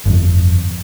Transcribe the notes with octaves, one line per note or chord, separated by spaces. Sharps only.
G1 F2